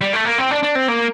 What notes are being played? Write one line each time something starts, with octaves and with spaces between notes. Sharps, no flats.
G3
A3
A#3
C4
D4
D4
C4
A#3